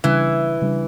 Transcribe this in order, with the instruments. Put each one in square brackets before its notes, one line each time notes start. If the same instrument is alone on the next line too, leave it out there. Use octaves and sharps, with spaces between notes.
[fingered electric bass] C#3 G3 D4 [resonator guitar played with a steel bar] E3
[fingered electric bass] C#3 G3 D4